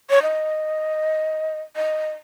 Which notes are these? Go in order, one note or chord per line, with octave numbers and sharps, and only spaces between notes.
C#5
D#5
D#5